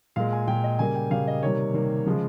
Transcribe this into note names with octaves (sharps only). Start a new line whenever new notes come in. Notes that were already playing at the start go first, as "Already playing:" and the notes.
A#2 G#3 F5
G#5
A#2 G#3 G5
D#5
C#3 G3 A#3 G#5
G5
C#3 G3 A#3 F5
D#5
C3 D#3 G3 A#3 C#5
C3 D#3 G3 A#3
C#3 F3 G#3